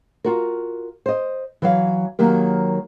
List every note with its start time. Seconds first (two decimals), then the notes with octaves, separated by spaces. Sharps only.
0.24 F4 F#4 A#4
1.06 C5 D#5
1.62 E3 F#3 F5
2.19 D#3 F#3 A#3 G4 A#4